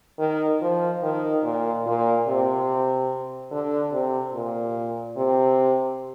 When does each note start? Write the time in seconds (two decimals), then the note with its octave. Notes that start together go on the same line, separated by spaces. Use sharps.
0.19 D#3
0.61 F3
1.03 D#3
1.43 A#2
1.86 A#2
2.27 C3
3.51 D3
3.92 C3
4.34 A#2
5.17 C3